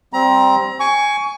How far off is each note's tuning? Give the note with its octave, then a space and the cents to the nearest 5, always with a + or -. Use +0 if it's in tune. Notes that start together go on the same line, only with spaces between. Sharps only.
G3 +0 C4 +0 A#5 +30
G#5 +0 C#6 +25